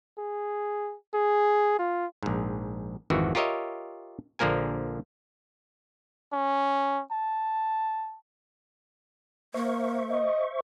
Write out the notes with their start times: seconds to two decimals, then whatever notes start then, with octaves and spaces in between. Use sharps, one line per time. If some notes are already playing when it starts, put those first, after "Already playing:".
0.18 G#4
1.14 G#4
1.79 F4
2.23 A#1 G#2
3.10 G#1 F2 D#3 E3 F#4
3.35 F4 G4 A#4 C#5 D#5 E5
4.39 A#1 D3 F3 A#3 A#4 G#5
6.33 C#4
7.12 A5
9.54 A#3 C5 E5 C#6
10.10 D#5